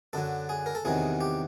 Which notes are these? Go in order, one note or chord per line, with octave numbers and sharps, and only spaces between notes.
F#2 D3 F#3 A4
G#4
A#4
A4
E2 C3 D#3 F#3 G#4
G4